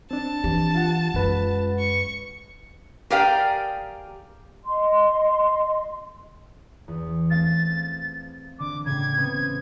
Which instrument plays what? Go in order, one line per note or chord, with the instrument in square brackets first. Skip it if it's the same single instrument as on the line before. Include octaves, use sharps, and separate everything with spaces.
[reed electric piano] C4 D4 [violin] A5
[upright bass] E3 [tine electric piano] G4
[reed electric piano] F4 F#5
[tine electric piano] F#2 B4 [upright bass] G#3
[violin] C#6
[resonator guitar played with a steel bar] G4 G#4 A#4 D5 F5 G5
[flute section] D#5 C6
[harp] E2
[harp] A3 C4 F5 [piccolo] A6
[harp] G#6
[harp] D3 [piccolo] D6
[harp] A2 C#3 [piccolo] G#6
[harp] B3 C4